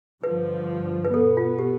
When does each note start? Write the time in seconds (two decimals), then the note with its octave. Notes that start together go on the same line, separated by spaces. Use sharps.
0.23 G2 D3 F3 B4
1.05 B4
1.14 B2 B3 A4
1.37 F4
1.59 G4